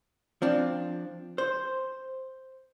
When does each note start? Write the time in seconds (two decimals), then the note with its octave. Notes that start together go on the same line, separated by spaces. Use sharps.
0.42 F3 C4 D4
1.38 C5